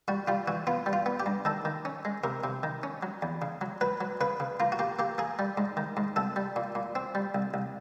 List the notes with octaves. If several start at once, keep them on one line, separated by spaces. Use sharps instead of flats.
G3 F#4
G3 F4
E3 F#4
B3 F4
G3
F4
B3
G4
G2
D#3 A4
D#3
C#4
G#3
C3 A#4
C3
D#3
C#4
F#3
E2
C#3
F#3
F#3 B4
F#3
C#3 B4
C#3
A#3 F4
F#4
A#3 G4
A#3 G4
A#3 G#4
G3
G#2
D#3
G#2
C2 A4
G3
A#2
A#2
C4
G3
C2
C2